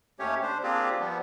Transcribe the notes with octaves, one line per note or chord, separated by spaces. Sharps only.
D#2 A3 C#4 G4 C#5
D4 C5
A#3 C4 D4 F4 G4 G#4
F3 G3 B3